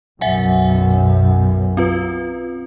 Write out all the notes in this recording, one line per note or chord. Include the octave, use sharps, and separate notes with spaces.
B1 F#2 B2 E5 F#5 G#5
C4 F4 B4